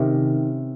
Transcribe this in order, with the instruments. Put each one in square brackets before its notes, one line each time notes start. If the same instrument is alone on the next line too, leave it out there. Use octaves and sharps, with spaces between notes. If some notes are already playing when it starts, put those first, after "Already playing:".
Already playing: [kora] C3 D#3 C#4